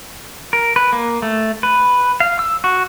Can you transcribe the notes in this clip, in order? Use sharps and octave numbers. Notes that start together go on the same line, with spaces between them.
A#4
B4
A#3
A3
B4
F5
E6
F#4